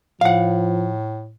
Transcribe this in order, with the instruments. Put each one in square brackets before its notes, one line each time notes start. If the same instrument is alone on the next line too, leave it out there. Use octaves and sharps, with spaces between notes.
[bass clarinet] A2 [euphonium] F3 [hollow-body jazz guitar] F5 F#5